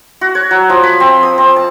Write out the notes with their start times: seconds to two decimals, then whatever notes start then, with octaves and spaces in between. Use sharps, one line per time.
0.21 F#4
0.35 C#5
0.51 F#3
0.69 F3
0.83 B5
1.00 C4
1.23 D#6
1.38 C4
1.56 A5